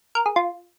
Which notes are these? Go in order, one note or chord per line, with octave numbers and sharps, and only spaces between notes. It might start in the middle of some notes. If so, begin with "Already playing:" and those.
A#4
G#4
F4